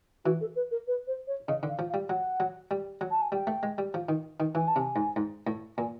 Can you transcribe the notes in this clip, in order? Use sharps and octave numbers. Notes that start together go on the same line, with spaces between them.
E3 F#4
A4
B4
A#4
B4
C5
C#5
C#3 D#5
D3
F5
F3
F5
G3
F#3 F#5
F#3
G3
F#3
A5
G#5
G3 G5
A3
G#3
G3
F3
D#3
D#3
E3 G#5
A5
C3 G#5
G#2
G#2
A2
A#2 G#5